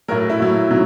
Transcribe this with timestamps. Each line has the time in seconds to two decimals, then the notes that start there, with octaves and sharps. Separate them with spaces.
0.08 A2 F#3 A#4
0.29 E4
0.40 A2 F#3
0.70 C3 D#3 F#3